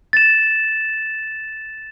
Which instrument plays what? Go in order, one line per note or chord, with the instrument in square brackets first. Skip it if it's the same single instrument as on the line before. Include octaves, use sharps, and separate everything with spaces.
[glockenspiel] A6 E7